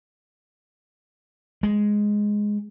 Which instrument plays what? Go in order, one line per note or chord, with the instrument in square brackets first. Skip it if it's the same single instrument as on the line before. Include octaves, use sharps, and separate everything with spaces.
[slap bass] G#3